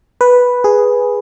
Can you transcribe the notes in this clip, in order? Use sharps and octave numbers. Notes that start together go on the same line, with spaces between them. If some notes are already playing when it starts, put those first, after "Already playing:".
B4
G#4